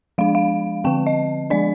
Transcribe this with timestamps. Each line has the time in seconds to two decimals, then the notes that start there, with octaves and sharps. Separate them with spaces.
0.18 F3 G#3 D4 F5
0.35 F5
0.84 D3 F3 C4 G5
1.07 D#5
1.50 F3 G#3 D4 D5